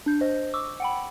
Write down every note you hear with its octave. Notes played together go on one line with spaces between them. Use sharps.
D4 G6
C5 D#5
C#6 D6 E6
F#5 G5 B5